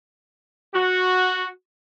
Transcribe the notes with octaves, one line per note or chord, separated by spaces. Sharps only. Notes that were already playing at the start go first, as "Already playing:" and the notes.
F#4